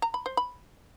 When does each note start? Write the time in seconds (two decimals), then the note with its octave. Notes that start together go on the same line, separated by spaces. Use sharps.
0.02 A#5
0.14 B5
0.26 C5
0.37 B5